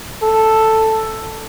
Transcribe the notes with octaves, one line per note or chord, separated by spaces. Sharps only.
A4